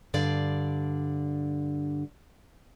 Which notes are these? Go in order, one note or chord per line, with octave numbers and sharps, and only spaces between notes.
G2 D3 D5 F5